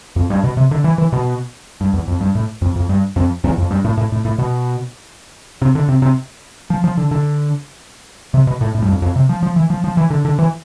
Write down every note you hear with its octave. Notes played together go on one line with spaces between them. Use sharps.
F2
G2
B2
C3
D3
E3
E3
B2
G2
E2
F2
G2
A2
F2
F2
G2
F2
E2
F2
G2
A2
A2
A2
A2
B2
C3
D3
C3
C3
F3
F3
D3
D3
C3
B2
A2
A2
G2
F2
F2
C3
F3
F3
E3
F3
F3
E3
D3
D3
E3